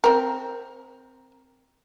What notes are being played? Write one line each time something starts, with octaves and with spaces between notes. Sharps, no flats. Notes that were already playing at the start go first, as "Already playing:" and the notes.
C4 A#4